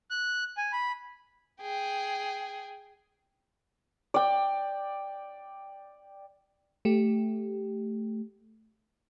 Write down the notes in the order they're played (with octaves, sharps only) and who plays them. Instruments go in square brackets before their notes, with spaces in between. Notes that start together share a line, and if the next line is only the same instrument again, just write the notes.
[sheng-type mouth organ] F#6
G#5
B5
[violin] G#4 G5
[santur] D5 G5
[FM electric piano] A3 G4